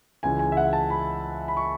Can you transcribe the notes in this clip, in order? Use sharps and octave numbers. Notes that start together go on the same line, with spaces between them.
C#2 C#3 E3 G#5
G#5
E5
F#5
A5
B5
B5
C#6